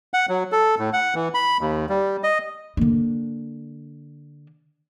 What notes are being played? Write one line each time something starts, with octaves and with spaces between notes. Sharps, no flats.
F#5
F#3
A4
A2
F#5
E3
B5
D#2
G3
D#5
D3 A#3